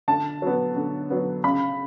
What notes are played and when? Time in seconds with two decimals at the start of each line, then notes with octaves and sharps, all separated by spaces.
0.08 D3 A5
0.42 F#3 B3
0.76 D3
1.10 F#3 B3
1.44 C#3 B5